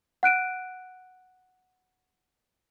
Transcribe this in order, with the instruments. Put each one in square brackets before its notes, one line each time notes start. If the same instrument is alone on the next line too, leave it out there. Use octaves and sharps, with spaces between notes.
[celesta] F#5 F#6 D7 D#7